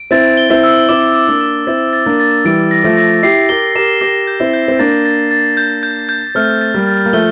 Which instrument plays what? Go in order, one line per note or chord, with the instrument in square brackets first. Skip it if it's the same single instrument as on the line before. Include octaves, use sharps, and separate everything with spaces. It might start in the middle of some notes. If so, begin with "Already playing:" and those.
Already playing: [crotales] D7
[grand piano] C4 E4 [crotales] A6
[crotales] G7
[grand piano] C4 E4
[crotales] E6
[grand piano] C4 E4 [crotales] D6
[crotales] D6
[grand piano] A#3 D4
[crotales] D6
[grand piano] C4 E4 [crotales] A6
[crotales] A6
[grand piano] A#3 D4
[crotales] A6
[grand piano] E3 G3 [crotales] D7
[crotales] A#6
[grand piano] F3 A3
[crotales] A#6
[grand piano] E4 G4 [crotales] C7
[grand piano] G4 A#4 [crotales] G7
[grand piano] G4 A#4 [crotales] E7
[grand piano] G4 A#4 [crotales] A#6
[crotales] G6
[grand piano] C4 E4
[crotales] G6
[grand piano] C4
[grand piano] A#3 D4 [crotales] A6
[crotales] A6
A6
G6
G6
G6
[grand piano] A3 C4 [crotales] F6
[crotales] A6
[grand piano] G3 A#3
[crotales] A6
[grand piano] A#3
[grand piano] F3 A3 [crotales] G7